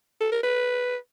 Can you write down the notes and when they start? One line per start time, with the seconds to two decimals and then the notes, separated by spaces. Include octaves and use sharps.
0.21 A4
0.32 A#4
0.43 B4